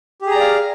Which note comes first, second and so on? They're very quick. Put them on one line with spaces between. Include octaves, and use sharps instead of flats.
G4 G#4 A#5 D5 F5